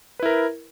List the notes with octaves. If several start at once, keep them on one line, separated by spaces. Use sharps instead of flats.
E4 A#4 B4